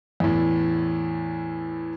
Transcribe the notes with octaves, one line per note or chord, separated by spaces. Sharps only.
E2 A2